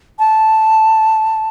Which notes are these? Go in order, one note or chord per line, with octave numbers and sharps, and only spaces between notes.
A5